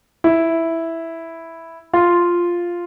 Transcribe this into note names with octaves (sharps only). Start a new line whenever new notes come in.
E4
F4